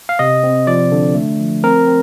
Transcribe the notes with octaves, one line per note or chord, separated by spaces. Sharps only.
F5
C3 D#5
C4
F3 D5
D3
A3
F3
C4 A#4
C4